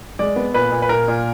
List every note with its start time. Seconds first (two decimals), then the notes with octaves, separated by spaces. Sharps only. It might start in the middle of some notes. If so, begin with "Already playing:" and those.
0.19 G#3 D5
0.36 B3
0.54 A#2 B4
0.72 A#2
0.82 B4
0.89 A#2 A#4
1.08 A#2